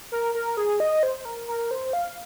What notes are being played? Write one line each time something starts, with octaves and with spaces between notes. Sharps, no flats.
A#4
A#4
G#4
D#5
C5
A#4
A#4
C5
F5